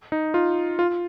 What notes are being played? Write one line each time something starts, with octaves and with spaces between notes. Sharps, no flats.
D#4
F4
F4